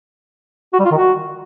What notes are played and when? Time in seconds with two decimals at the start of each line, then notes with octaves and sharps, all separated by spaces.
0.73 F#4
0.79 G3
0.85 F4
0.91 D#3
0.97 F#4